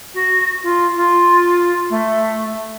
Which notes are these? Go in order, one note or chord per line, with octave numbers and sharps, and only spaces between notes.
F#4
F4
F4
A3